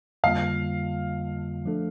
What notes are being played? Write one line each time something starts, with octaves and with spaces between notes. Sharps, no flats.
F2 D3 G3 A#3 F4 F5
F3 A3 D4 A4